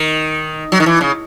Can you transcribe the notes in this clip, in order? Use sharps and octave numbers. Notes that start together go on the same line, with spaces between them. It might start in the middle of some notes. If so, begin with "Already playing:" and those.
Already playing: D#3
F#3
D#3
E3
C#3